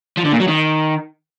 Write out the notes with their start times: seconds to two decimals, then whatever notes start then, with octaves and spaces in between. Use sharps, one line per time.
0.17 F3
0.25 D3
0.33 A#2
0.40 F#3
0.48 D#3